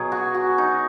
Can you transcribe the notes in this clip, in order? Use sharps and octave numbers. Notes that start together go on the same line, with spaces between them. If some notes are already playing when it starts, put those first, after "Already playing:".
Already playing: B2 F#3 G#4
F#4
F#4
D#4